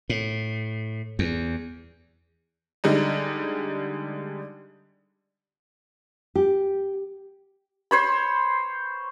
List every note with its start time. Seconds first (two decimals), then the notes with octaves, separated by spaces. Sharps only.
0.09 A2
1.19 E2
2.84 D3 G3 G#3 D#4
6.35 G4
7.91 C5 C#5 B5